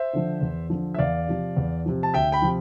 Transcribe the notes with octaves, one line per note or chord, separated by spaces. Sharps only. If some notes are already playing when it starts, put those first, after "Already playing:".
Already playing: C5 E5
D3 F3
E2
D3 F3
E5
E2 D5 F5
C3 F3
E2
C3 F3
A5
D2 E5 G5
G5 B5
C3 F3